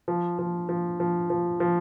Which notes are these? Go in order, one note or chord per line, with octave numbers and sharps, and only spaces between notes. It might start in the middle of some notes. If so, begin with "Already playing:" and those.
F3
F3
F3
F3
F3
F3